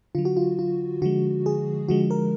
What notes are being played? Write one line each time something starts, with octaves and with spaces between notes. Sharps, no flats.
D3 F#3 F4
F#4
F4
F4
D3 F3 G#3 F#4
G#4
D3 F3 G#3 F#4
A#4